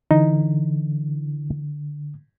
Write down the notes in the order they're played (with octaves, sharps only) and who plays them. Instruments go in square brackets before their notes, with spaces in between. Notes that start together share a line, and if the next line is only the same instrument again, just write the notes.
[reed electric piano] D3 [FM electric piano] E3 [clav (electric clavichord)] D#4